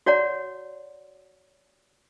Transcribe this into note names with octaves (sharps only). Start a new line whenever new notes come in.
F#4 C#5 D5 F#5 A#5